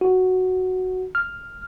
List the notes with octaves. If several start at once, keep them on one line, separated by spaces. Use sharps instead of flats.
F#4
F6